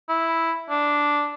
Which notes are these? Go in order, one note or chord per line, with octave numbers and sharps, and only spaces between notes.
E4
D4